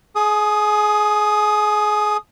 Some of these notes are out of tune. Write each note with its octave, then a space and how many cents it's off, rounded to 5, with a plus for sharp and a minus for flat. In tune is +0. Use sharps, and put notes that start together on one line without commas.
G#4 +25 D#6 +0